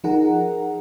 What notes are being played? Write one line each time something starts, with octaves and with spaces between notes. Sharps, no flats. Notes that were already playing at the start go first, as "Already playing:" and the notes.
F3 D#4 G#4 A#4 F#5 A#5